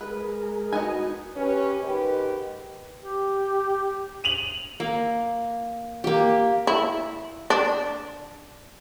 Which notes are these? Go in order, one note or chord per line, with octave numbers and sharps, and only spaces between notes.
G#3 G#4 A#4 B4
B3 D#4 F#4 D#5 G#5
C#4 G4 B4
G#2 D#3 G4 B4
G4
D#7 F7 F#7
A#3
A#3 G4
E4
D4